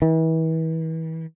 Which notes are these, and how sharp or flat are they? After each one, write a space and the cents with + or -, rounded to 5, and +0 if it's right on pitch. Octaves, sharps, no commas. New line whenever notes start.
E3 -35